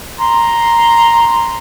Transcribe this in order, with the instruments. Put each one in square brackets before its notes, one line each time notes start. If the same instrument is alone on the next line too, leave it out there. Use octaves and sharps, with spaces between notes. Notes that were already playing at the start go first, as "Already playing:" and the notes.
[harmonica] A#5 C6